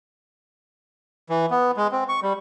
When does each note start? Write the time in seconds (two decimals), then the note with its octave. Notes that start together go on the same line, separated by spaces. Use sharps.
1.30 E3
1.50 B3
1.77 G#3
1.92 C4
2.09 C#6
2.22 G3